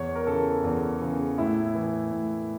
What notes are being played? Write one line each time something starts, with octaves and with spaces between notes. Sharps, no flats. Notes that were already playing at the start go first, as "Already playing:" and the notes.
Already playing: E2 C#5
A#4
C#3 E3 A4
E2
C#3 E3
A2 E4
E3
A2